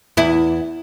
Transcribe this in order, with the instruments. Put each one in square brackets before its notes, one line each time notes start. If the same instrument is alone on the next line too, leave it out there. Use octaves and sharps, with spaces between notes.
[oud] E2 E4